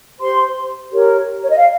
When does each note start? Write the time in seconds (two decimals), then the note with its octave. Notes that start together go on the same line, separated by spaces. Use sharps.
0.20 G4 C5 C6
0.92 G4 A#4 C#5
1.43 C#5
1.50 D#5
1.57 F5